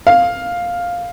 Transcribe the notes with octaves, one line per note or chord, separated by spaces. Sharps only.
F5